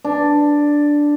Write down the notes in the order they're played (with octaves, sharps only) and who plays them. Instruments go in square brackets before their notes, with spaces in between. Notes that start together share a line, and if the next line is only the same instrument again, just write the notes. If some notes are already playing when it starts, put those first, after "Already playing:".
[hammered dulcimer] D4